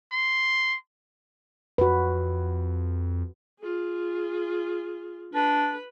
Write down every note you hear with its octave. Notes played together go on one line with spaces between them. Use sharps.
C6
F2 F#4 B4
F4 G#4
D4 B4